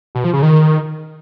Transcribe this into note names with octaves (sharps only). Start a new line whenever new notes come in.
B2
F3
C#3
D#3